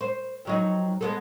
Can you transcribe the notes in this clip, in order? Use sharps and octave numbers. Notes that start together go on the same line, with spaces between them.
C5
F2 F#3 D#4
G#3 B3 A4